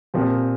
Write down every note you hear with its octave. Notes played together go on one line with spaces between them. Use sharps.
A#2 F3 C4 G4